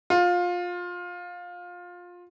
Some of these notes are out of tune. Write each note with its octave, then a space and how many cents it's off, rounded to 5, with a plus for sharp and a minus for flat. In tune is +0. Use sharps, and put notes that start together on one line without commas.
F4 +20